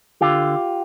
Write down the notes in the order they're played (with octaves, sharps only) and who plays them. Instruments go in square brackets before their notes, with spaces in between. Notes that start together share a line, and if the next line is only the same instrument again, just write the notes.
[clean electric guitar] D3 F4 G4